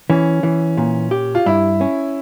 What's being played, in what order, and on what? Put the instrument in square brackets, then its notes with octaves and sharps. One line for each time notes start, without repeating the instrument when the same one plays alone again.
[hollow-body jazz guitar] E3 [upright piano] C#4
[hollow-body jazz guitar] E3
A#2
G4
[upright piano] F4
[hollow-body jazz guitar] G2 [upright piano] E4
[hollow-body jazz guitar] C#4